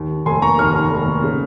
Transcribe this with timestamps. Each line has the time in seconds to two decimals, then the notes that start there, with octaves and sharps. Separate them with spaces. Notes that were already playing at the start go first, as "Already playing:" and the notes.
Already playing: D#2
0.10 D#3
0.26 F1 G#5 C6
0.42 A#3 A#5 C#6
0.58 D#2 C#6 F6
0.75 D#3
0.90 F1
1.06 A#3
1.22 C#3